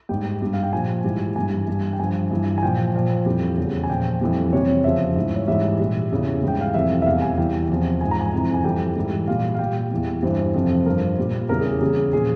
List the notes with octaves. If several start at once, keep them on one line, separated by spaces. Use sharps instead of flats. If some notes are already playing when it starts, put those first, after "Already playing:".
G#2 G3 G5
G2 G3
F5
G5
A#2 F3 G#5
G#2 E3 G3
G2 E3 G3 G#5
G2 G3
G5
G2 F3 G#5
G2 E3 G3
G#5
A#2 F3 G5
A#2 F3
F2 E3 G3
E2 C#3 G3
G#5
A#2 F3 G5
F2 E3 G3
F2 C3 G3 C#5
E2 C#3 F3 E5
G#2 E3 G3
C#5
G#2 E3 G3 E5
A#2 G3
E2 C#3 E3
G#2 E3 G3 G5
F5
F2 C3 E3 G3 E5
E5
E2 C3 G3 F5
G#5
E2 E3 G3 G5
E2 C3 F3
G#2 F3 G#5
A#5
G#5
F2 C3 E3
G#5
F2 E3 G3 G5
G#2 E3 G3
A#2 G3 F5
F5
A#2 G3 G5
E2 E3 G3
G2 E3 G3 C5
F2 C3 F3
G2 F3 A#4
A#2 G3
E2 C#3 E3 G3 A#4
G#4
G4
E2 C#3 G3 G#4
A#2 F3 G#4